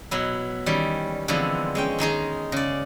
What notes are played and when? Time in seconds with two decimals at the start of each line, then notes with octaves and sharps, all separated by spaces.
0.11 B2 F#3 E4
0.66 D#3 E3 G3 C#4
1.28 D3 E3 F3 G#3 B3 C4
1.75 G#3 C#4 G5
1.98 D#3 G#3 D#4 G#4
2.52 C#3 D5